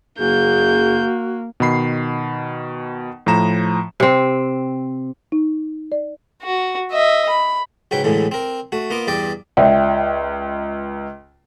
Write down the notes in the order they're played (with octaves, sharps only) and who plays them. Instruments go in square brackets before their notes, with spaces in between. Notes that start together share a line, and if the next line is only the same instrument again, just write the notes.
[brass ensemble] F#1 G#4 [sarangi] A#3 [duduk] F#4 [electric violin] G6
[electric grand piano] B2 D#3 B5 C7
A2 F3 A#5 E7
[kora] C3 C4
[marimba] D#4
D5
[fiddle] F#4
D#5 E5
B5
[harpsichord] C#2 G#2 F#3 B4 G5
A1 D2 A2 D3 E3 G#3
C4 A#4
A3 F#4
A#3 B3 F4 D#5 D6
E2 G2 D5 D#5 G5 D6
[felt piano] C#2 [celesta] D5 E5 G5